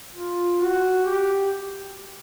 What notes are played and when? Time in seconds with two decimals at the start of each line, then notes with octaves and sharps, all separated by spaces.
0.15 F4
0.60 F#4
1.05 G4